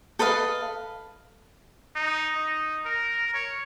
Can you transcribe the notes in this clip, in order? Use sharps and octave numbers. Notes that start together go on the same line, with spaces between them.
A4 B4 D#5 F5
D#4
D#4
A#4
C#5